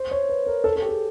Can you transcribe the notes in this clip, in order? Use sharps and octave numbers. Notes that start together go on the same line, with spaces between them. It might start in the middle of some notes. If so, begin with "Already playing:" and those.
Already playing: C5
C#5
B4
A#4
A4
A4
G4
G#4